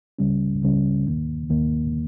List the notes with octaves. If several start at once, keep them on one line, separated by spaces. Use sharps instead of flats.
C#2 C#3 G3 C#4
C#2 C#3 G3 C#4
D#2 D#3 A#3
D#2 D#3 A#3